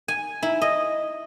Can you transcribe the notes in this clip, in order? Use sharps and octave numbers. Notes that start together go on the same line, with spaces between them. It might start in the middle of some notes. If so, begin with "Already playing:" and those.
G#5
E4
D#5